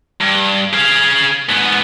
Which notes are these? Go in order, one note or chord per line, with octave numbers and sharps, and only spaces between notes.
G2
G#4 F5
G#2 B3